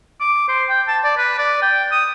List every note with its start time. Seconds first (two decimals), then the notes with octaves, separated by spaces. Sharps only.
0.21 D6
0.49 C5
0.69 G5
0.88 A5
1.04 D5
1.17 B4
1.38 D5
1.62 G5
1.92 D#6